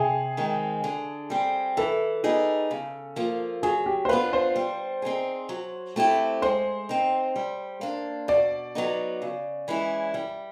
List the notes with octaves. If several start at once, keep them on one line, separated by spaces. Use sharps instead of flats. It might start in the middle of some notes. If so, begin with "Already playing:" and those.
Already playing: C3 G#4
D#3 G#3 C4
D3
G3 C4
E3 A4
G3 B3 D#4 G#4
C#3
F3 A#3
F#3 G#4
G4
C5
B3 D4 F4 B4
C5
G3
C4 D#4 G#4
F#3
A3 C4 E4 G4
G#3 C5
C4 D#4
G3
A#3 D4
B2 D5
F#3 B3 D#4
C#3
E3 G#3 C#4 E4
G3